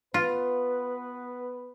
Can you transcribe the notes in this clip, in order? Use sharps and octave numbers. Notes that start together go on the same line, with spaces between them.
B3 F4 B4